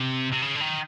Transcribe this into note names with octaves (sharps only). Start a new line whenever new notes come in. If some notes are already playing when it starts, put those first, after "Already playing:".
Already playing: C3
C3
C#3
D3
D#3